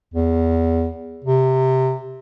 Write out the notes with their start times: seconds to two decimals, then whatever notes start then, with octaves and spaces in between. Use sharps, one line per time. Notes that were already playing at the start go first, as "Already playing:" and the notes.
0.14 E2
1.24 C3